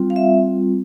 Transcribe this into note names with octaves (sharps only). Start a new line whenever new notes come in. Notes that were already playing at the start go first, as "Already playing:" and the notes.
Already playing: G3 C4 F4
F5
E5